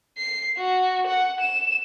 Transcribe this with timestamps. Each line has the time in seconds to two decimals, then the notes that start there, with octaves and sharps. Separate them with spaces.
0.18 C7
0.57 F#4
1.07 F#5
1.41 E7